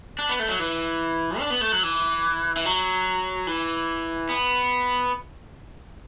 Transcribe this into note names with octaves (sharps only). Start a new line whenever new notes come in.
D4
B3
A3
F#3
E3
D4
B3
A3
F#3
E3
E3
F#3
E3
B3